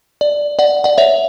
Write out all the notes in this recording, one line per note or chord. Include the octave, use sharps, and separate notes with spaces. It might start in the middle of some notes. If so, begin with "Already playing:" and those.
D5
D5 F#5
D5 F#5
C#5 E5